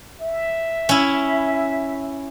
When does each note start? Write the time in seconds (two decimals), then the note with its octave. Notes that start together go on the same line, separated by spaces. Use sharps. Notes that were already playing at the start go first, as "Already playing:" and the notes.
0.21 E5
0.89 C#4 E4